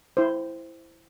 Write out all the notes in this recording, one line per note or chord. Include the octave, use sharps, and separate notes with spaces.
E4 C5